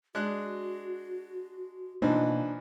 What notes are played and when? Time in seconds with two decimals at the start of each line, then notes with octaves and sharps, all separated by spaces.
0.15 G#3 D4 F#4 F#6
2.02 B2 E3 F3 A#3 D4 D#4 C5